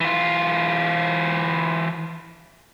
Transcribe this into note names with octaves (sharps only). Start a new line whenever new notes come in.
E3 F4